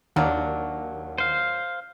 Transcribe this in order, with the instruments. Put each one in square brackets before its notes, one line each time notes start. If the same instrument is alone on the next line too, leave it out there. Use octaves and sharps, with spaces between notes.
[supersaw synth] D#2 [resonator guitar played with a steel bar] F#3 A#3 D4 [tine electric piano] F#5
[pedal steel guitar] C5 F5